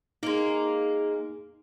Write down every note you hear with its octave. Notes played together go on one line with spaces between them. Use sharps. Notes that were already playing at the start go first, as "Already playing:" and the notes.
G#3 A#3 D#4